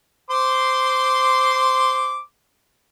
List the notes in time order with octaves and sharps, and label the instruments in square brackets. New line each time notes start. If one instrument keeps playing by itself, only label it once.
[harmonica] C5 C6 D6